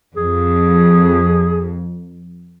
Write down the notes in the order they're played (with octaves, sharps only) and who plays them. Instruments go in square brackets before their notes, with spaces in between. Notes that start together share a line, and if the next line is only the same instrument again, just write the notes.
[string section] F2 [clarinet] G#4